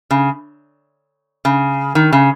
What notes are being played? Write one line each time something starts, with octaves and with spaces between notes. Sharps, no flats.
C#3
C#3
D#3
C#3